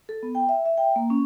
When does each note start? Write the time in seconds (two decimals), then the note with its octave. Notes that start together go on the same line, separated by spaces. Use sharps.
0.09 A4
0.23 B3
0.35 G5
0.49 E5
0.66 E5
0.78 G5
0.96 A#3
1.10 C#4